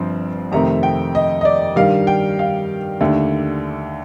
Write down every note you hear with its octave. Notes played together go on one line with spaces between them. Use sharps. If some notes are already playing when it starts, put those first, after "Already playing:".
Already playing: G1 G2 F3 C4
F2 C3 D#3 A3 C4 A#5
G5
D#5
D#5
D5
G2 D#3 G3 F5
G5
F5
D#2 D3 A3